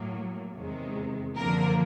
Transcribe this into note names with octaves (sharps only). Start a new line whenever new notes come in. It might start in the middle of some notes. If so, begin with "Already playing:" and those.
Already playing: A2 F#3 A#3
E2 C3 D#3 G#3
F#2 D3 F3 A#3 A#4